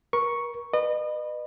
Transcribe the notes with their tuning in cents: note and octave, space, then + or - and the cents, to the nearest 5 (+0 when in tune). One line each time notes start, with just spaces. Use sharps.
A#4 +35 C#6 +0
B4 +0 D#5 -40